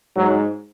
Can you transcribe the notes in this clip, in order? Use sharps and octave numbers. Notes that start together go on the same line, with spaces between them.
G#2 F#3